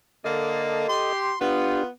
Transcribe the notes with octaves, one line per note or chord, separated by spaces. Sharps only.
D3 A#3 A4 D#5
G4 C6
B3 D4 F4 G4